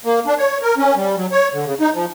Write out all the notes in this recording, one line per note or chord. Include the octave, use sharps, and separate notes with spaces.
A#3
D4
C#5
A#4
C#4
G3
F#3
C#5
D3
C#3
D#4
F3